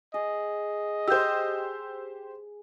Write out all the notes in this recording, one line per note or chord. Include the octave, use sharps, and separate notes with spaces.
G#4 D#5
G4 C5 E6 G6